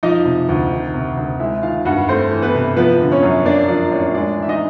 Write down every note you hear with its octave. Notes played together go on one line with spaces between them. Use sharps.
F3 D#4 D#5
C3
D2
D#3
C3
D2
G#3 E4 E5
D#3 F4 F5
G2 F#4 F#5
A3 C4 C5
E3
B3 B4
C3
F3 B3 B4
D3
C#4 C#5
F#2
A#3 D4 D5
F3 D4 D5
A2 C#4 C#5
G#3 D4 D5
E3
E5
D#4 D#5